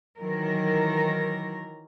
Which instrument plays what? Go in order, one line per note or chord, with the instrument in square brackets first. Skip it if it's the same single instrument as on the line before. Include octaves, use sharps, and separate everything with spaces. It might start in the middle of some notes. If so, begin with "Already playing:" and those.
[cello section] D#3 E3 F#3 A#4